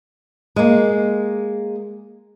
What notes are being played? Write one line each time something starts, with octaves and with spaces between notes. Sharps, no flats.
G#3 A#3